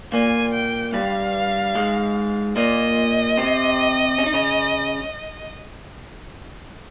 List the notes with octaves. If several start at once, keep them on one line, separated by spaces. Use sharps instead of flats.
A#2 A#3 G#5
G5
G2 G3 F5
G#2 G#3
A#2 A#3 D#5
C3 C4
C#4
D#4
C#3 C#4